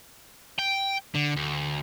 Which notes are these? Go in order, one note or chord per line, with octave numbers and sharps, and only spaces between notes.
G5
D3
D2